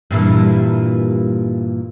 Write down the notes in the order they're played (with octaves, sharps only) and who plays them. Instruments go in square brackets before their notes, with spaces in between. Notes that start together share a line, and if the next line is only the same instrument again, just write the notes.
[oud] G2 A#2 E3